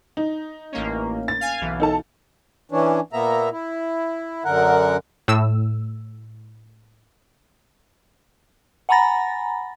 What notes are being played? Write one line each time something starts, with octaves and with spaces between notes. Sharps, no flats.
D#4
A1 A#3 C#4
A6
F5 G#5
B1 E3
D#4 A4 A5
E3 C#4 D4
A#2 A#3 B3 E5 A#5
E4
F#2 D3 A#4 F#5
A2 E6
F#5 G#5 A#5 B5 A6 A#6